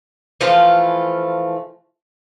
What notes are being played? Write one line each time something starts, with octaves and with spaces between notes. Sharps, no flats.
E3 F3 A3 F4